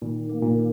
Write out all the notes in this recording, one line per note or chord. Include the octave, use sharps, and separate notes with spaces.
A#2 D#3
A#3
A#2
D#3